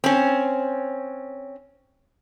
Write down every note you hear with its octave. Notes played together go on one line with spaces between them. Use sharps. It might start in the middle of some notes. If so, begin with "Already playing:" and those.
C4 C#4